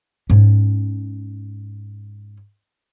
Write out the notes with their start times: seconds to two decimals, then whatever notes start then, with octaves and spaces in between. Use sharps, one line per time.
0.30 G#2 C#4